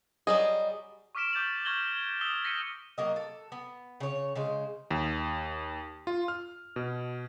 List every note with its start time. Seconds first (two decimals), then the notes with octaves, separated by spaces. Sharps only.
0.27 F#3 G3 G#4 D#5
1.15 C#6 D6 F6 B6 D7 E7
1.33 D6 G6 A6 F7 F#7
1.65 C#6 F6 G#6 A#6 F#7 G7
2.00 E7
2.21 D#6 E6 B6 E7 G7
2.44 A#6 B6 C#7 D#7
2.98 F#3 A#3 D#5
3.16 A4
3.52 B3
4.00 C#3 C#5
4.35 C#3 G#3 C5
4.91 D#2
6.07 F4
6.28 F6
6.76 B2